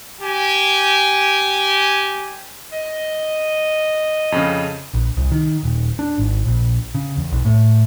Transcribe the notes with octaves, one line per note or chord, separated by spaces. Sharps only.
G4 G#5
D#5
F2 C#3
A#1
C2
D#3
D#1
D4
G#1
A#1
C#3
E2
B1
A2